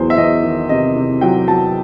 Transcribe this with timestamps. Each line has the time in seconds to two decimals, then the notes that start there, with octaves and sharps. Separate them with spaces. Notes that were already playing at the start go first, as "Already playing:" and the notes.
Already playing: E2 F#3 C5
0.10 E5
0.17 E2 D#5
0.43 D#3
0.69 C3 D#5
0.96 C3
1.21 F#3 G5
1.48 F#3 A5